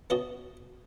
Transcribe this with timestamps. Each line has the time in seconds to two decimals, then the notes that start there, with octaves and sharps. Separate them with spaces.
0.10 B3 C#4 F#4 D#5 A5